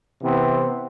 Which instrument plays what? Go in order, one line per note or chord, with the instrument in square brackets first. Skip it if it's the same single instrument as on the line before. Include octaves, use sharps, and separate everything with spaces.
[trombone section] C3 E3 B3 C4